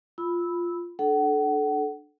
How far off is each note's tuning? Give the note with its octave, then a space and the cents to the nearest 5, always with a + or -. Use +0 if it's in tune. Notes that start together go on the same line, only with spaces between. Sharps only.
F4 +0 B5 +0 E6 -15
D4 +15 A4 -20 F#5 +30